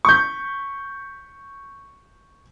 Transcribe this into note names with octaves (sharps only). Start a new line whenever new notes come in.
C#6 G6